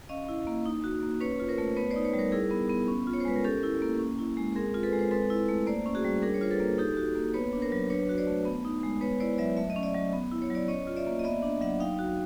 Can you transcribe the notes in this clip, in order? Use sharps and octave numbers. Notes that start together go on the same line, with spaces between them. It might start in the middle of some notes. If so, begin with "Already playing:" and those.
C#4 D#5 F5
E4
A#3
D#4
F#4
A#3
C#4 B4 C#5
F4
A#4 C5
A3
B3 B4 C#5
C5 D5
D#4
B4 C#5
G3
A#4 C5
E4 G#4 A#4
B3
B3
C#4
F4
C#5
C5
G#3 B4
A#4
C#4 G4 A4
E4
A#3
C#4
E4
G#3
C4 G#4 A#4
F4
A4 B4
G#3
C5
C4 A4 B4
E4
A3
A#3 C5 D5
C#4
F#4 G#4
G3
D4 G#4 A#4
C#5
F4 C5
A4 B4
A#3
D#4 G4 A4
G4
F#4
A#3
B3 B4 C#5
D4
A#4 C5
F#3
D4 B4 C#5
F#4
C5 D5
A3
B3
D#4
G#3
B3 B4 C#5
E4 C5 D5
F#3 D5 E5
A3 E5
D#5
C#4
D5 E5
F#3
B3
E4
C#5
F#3 D5
C#4 C#5 D#5
F4
D5 E5
A#3
D#5
B3 D5 E5
D4
F#3 E5 F#5
D#4 F5 G5
F#4